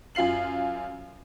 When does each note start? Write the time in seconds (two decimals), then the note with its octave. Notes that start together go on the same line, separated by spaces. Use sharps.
0.15 F#2 F4 F5 C7 F#7